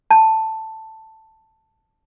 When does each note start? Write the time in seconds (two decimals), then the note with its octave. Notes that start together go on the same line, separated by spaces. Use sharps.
0.11 A5